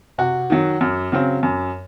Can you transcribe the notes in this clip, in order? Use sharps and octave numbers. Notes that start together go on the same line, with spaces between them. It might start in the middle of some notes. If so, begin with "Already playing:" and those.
C3 F#4
D#3 F#3
F#2
C#3 F#3 C4
F#2